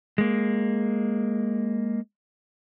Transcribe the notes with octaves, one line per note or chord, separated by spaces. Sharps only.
G#3 A#3